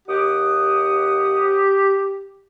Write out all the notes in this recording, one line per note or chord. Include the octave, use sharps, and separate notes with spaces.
D#2 G4 F#5 D#6